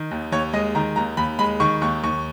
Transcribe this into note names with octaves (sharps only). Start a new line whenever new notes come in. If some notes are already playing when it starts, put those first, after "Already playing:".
Already playing: D#3
D#2
D#2 C#5
G#3 D#5
D#3 A#5
D#2 A#5
D#2 B5
G#3 B5
D#3 C#6
D#2 C#6
D#2 C#6